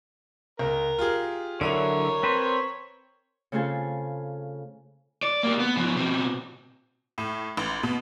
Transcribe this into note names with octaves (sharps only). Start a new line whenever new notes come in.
C#2 A#4
F4 G4 G#4
D3 F#3 E4 A#4 C#5 D7 D#7 F7
C4 B4 C5
C#3 A3 C4 F4 G#4 A4
D5
A#3 G4
B3
F3 B3
B2 C4
A2
A1
B2